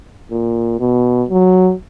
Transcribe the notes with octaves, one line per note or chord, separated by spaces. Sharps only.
A#2
B2
F#3